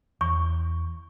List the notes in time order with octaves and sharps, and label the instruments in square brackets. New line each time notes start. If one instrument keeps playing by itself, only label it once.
[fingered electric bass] E2 [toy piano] C#6